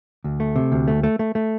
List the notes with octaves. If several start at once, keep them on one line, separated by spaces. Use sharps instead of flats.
D2
A3
C3
D2
A3
A3
A3
A3